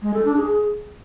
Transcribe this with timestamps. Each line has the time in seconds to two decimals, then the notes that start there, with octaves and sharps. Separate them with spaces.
0.02 G#3
0.13 A4
0.25 D4
0.36 G#4